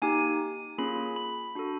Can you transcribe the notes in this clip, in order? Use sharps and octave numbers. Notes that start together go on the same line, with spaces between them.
A#3 D#4 G4 G#5
A#3 C#4 F4 G#4 B5
B5
D4 F#4 A4